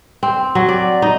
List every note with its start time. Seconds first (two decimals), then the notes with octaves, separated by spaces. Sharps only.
0.23 C4
0.55 F#3
0.69 D5
1.02 D#4